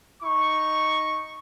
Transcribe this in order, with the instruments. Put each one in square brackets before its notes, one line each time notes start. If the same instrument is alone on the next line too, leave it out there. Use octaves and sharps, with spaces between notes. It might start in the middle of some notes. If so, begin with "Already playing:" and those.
[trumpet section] D#4 C#6